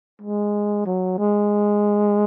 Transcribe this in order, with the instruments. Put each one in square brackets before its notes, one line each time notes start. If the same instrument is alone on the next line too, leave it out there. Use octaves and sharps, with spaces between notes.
[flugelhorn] G#3
F#3
G#3